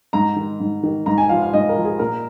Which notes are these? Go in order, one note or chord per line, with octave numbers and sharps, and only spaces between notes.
G#2 A#5
D#3
G#2
D#3
G#2 A#5
G#5
F3 F5
F5
G#2 D#5
A#4
F3
G#4
A#2 A#4